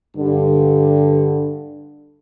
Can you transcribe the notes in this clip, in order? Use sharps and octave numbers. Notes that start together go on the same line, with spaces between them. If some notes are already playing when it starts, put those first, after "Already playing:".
G2 D3